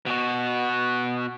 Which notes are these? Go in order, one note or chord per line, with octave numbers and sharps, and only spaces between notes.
B2 F#4